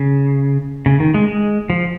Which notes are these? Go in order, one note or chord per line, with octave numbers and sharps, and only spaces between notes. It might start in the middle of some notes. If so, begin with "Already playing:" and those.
Already playing: C#3
C#3
D#3
G#3
G#3
F3